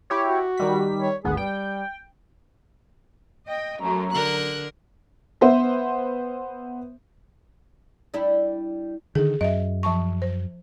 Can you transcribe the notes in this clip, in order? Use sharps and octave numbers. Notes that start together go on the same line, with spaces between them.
E4 G4 C#5
F#4
D#3 G3 B6
C#5
G#1 D2 B3 G#4
G3 G5
D#5 G5
F#2 F#3 A3 A#5
D3 A#4 F#6
B3 C5 E5
G3 D4 E4
D3 D#3 G#4
F#2 D#5 E5
F3 A5 C#6
C5